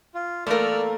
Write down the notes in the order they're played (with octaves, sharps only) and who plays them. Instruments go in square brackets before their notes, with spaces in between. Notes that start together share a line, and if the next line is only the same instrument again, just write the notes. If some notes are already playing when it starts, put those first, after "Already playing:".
[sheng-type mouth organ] F4
[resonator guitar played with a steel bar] E2 A#4 [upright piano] A3 A#3 [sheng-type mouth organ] D5 E6 F6